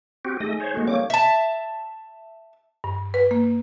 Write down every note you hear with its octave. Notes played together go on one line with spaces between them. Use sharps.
C4 F#4 G4
A3 D#4 G#4 D#5
C5 C#5
G#3 A#3 F#4 A4
G3 C4 C#5 F5 D6
E5 A5
G2
B4
A#3